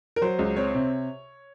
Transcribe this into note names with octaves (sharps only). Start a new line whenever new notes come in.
A#4
F#3 C5
C#2
C4 C#5
C3